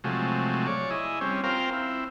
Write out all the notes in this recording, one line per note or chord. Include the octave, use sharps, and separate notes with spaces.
C3 F3 F#3 G#3 A3
C#5 D5
E4 G#4 D#5
G3 C4 C#4
C4 F4 A#4 C5 F5 G5
C4 E4